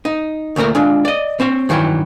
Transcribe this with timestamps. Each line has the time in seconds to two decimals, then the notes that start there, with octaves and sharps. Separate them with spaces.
0.05 D#4
0.56 D2 A#2 A3 A#4 A#5
0.75 G#3 D4 F4
1.05 D5 D#5
1.40 C4 C5 C#5
1.69 G2 D#3 E3 F#3 E4